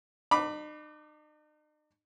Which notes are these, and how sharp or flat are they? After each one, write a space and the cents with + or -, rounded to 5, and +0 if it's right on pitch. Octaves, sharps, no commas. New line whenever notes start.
D#4 -45 B5 +0 D6 +0